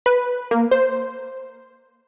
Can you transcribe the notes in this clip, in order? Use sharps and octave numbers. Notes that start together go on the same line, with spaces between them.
B4
A#3
C5